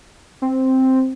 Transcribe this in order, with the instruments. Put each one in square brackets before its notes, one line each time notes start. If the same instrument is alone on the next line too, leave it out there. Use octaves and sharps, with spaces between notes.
[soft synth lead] C4